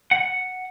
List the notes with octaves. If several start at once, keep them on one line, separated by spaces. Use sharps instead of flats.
F#5